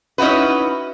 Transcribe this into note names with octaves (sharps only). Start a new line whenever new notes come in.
C#4 D#4 E4 F#4 B4